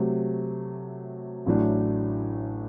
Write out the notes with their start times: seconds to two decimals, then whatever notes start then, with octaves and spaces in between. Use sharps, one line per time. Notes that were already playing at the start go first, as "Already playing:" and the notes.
Already playing: C3 F#3 A3
1.46 A1 A2 F#3 A3 D4